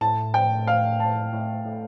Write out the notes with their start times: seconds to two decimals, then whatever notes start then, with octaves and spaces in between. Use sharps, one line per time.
0.01 A2 A5
0.34 G5
0.67 F5
1.00 A5
1.33 A2
1.65 A2